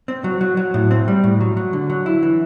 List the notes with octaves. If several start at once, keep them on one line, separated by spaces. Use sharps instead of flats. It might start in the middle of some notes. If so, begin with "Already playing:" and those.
C4
F#3
F#3
F#3
A2
C4
G3
A2
F#3
F#3
D3
F#3
E4
E3